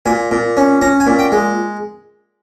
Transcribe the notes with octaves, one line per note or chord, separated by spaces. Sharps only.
A#2 G#5
A#2
C#4
C#4 A#5
G#5
A#2
G5
G#3